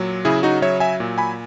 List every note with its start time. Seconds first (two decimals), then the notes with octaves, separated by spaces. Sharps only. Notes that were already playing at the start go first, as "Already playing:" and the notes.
Already playing: A#2 F#3
0.25 C#3 E4 G#4
0.43 D#4 F#4
0.62 F#3 C#5 E5
0.80 E5 G#5
1.00 A#2
1.18 G#5 B5